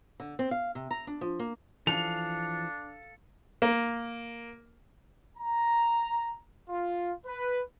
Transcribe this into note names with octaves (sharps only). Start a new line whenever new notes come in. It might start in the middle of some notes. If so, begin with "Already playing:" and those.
D3
C4
F5
C3
A#5
D4
F3
A#3
E3 F3 D4 A4 F5 F7
A#3
A#5
F4
B4